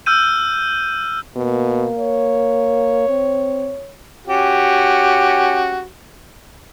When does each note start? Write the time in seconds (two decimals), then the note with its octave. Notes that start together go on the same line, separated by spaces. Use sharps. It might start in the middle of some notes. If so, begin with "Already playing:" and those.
0.06 E6 F6 G6 D#7
1.36 B2 A#3
1.99 C#5
3.09 C4
4.27 C#4 F#4 G4